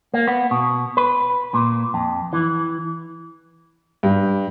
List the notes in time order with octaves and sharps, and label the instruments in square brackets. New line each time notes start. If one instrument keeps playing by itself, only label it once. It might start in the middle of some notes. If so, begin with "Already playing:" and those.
[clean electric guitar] A#3
B3
B2
B4
A#2
F2
E3
[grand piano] G2